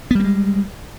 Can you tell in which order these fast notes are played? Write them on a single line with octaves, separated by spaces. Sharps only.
B3 G3 A#3 G#3